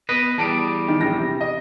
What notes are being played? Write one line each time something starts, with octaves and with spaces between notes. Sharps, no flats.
B3 B4 D#5
E2 G3 A5 D7
D#3
A#1 G4 A#6
C3
D#5